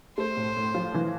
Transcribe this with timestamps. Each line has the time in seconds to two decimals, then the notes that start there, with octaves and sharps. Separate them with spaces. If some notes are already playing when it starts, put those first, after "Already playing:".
0.18 A3 C5
0.36 A2
0.56 A2
0.74 F3
0.94 E3